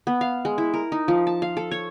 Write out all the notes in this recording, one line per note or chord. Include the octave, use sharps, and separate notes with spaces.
B3
F5
G#3
E4
A#4
D#4
F3
A5
F5
A4
C#5